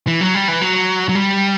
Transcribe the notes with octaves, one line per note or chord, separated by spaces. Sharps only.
E3
F#3
G3
E3
F#3
F#3
G3